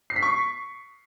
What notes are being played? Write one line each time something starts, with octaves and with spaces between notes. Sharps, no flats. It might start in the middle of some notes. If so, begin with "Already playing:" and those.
C7
B6
C#6